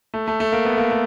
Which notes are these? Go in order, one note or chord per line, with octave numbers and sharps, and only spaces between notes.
A3
A3
A3
A#3
B3
A#3
A3